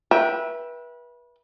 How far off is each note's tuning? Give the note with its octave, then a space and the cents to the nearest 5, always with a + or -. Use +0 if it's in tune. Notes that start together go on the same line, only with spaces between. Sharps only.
B4 -30 E5 +0 G5 +0